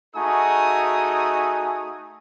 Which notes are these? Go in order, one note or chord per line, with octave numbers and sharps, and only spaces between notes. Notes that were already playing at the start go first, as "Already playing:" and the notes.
A3 D#4 F#4 G#4 G#5 D#6